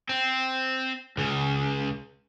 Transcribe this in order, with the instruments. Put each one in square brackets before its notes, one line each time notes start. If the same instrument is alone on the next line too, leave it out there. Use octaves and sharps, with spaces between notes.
[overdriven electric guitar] C4
C#2 C#3